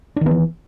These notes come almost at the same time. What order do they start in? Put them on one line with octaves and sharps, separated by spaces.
D4 D#3 B3 E3